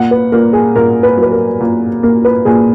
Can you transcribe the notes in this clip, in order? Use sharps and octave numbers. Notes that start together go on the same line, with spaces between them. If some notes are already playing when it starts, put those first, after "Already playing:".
Already playing: A#2 F#5
B4
A#2 A#4
G#4
A#2 A#4
B4
F#3 B4
A#4
A#2
A#3 A#4
B4
A#2 G#4